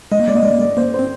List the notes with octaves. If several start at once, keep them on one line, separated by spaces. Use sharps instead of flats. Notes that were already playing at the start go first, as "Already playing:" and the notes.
G#3 D#5
A#3
G#3 D5
A#3 D#5
G#3 D5
A#3
G#3 D5
A#3 C5
C5
C4